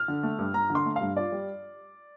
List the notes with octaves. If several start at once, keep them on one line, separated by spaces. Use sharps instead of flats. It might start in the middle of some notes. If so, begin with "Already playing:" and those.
Already playing: F6
D3
A3
G2
G2 A#5
D3
C6
A3
G2 F5
F4 D5
G3